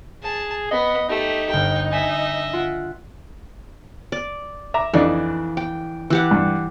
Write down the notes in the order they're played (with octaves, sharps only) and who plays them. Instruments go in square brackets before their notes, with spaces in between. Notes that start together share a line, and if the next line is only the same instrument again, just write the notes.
[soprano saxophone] G#4 [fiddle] A5
[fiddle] B3 [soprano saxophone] D#5
[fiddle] A3 G4 [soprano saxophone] D#4
[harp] G1 A#5 [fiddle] G5
[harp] D4 G5 G#5 [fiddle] D#5 E5
[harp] F4 F#5 D7
[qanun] D5
[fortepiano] E5 A#5 D6
[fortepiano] F2 D4 D#4 [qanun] E3
[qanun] G5
E3 G4 F#5
[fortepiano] G2